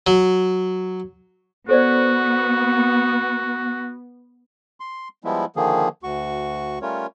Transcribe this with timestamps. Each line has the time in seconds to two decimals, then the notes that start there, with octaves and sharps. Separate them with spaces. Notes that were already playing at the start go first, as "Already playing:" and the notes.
0.07 F#3
1.69 B3 F#4 A4 C5 D5
4.80 C6
5.24 F3 G3 G#3 B3 E4
5.56 D3 D#3 F3 A#3 G#4
6.03 D2 F#4 C#6
6.82 G3 A3 C#4 F4 A#4 C#5